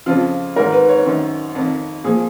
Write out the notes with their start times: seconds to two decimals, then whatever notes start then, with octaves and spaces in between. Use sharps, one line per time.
0.06 F2 C#3 F3 F4
0.56 G#2 D#3 A#4
0.72 B4
0.89 C#5
1.06 F#2 D#3
1.55 F2 D#3
2.04 A#2 F3 G#4